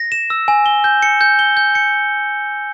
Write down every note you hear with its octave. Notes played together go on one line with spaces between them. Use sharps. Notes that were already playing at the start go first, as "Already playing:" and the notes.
Already playing: A#6
E7
E6
G#5
G7
G6
C#7
G6
G7
G6
C#7